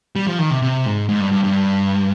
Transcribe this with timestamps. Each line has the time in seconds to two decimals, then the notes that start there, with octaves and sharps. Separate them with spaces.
0.16 G3
0.27 F3
0.39 D#3
0.50 C3
0.62 C3
0.86 G#2
1.09 G#2
1.21 G2
1.32 G2
1.44 G2